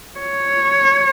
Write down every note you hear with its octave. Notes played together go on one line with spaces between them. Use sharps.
C#5